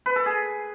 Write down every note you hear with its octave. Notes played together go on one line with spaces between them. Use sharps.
B4
A4
G#4